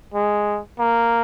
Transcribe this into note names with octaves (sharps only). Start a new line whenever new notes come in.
G#3
A#3